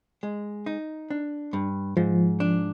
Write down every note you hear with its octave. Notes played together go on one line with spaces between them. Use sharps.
G#3
D#4
D4
G2
G#2 F3
D4